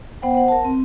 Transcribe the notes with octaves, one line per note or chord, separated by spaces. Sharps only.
B3 C5 F#5 G5
C5 F#5
A#4 A5
C4